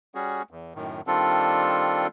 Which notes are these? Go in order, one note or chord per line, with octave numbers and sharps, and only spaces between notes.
G3 C#4 F#4 G#4
E2
F#2 A2 D#3
D#3 G3 C4 D4 F4 A4